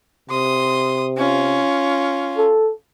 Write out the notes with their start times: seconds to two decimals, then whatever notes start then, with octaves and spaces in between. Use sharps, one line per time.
0.30 C3 C6 D#6
1.17 C#4 F4
2.38 A4